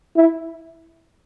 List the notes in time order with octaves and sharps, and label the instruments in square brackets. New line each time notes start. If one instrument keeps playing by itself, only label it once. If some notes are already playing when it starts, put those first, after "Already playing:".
[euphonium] E4